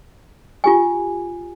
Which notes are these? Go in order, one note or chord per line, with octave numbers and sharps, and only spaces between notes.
F4 G4 G#5